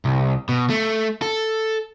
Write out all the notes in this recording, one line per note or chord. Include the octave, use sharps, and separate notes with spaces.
C2
B2
A3
A4